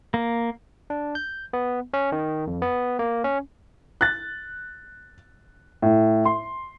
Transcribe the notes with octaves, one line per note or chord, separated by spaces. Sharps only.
A#3
D4
G6
B3
C#4
D#3
F2
B3
A#3
C#4
F#6 A6
A2
C6